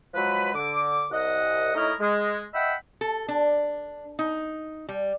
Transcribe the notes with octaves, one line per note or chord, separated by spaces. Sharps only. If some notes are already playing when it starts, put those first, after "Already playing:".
F3 F#3 G#3 B4
D3 D6
C2 D#5 F#5
A3 D#4 E4 A#4 C#5 D#5
G#3
D#5 E5 F#5 G5 B5 E6
A4
D4
D#4
G3